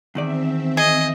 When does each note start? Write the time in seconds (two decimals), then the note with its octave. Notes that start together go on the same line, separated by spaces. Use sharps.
0.15 E2 D#3 C4 D5 E5
0.77 G#4 D#5